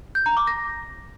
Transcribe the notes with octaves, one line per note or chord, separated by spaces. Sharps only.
G6
A#5
D6
A#6